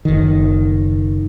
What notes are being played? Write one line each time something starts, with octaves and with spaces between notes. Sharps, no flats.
F#1 D#3